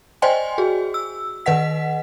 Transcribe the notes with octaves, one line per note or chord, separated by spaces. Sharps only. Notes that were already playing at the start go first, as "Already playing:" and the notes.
C5 D5 D#5 G5 G#5 C6
F#4 G#4
E6
D#3 B4 D#5 F#5 B6